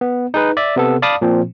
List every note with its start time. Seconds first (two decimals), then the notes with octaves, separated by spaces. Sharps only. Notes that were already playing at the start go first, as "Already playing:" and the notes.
0.01 B3
0.34 D#4 G#4 B4
0.57 D5 E5
0.76 C3 B3 A4
1.02 D5 F5 A5 B5 D6 D#6
1.22 A#2 F3 C4